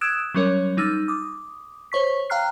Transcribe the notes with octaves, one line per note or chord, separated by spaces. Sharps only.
D#6 E6 F#6 G#6 D7 E7
F#3 G3 C#4 A#4 C#5
G3 D#4 E6 F6 A6
D6 D#6
C5 C#5 C#6 B6
F5 G5 A#5 F6 F#6 C7